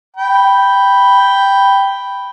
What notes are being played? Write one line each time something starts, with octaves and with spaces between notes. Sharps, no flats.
G5 B5